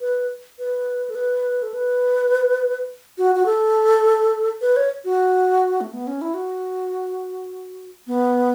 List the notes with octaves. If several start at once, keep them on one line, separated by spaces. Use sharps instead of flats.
B4
B4
A4
B4
A4
B4
F#4
F#4
A4
B4
C#5
F#4
A3
B3
C#4
E4
F#4
B3